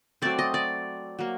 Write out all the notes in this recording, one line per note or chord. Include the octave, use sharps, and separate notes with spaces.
F#3 A3 C4 D5
D#5
D5
F#3 A#3